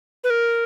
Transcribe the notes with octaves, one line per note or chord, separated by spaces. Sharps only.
B4
A#4